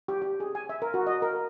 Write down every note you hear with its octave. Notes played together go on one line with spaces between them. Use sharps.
G4
G4
G#4
G#5
E5
A#4
F#4
D#5
A#4